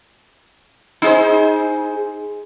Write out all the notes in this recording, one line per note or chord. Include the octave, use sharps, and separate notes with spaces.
D#4 G#4 C5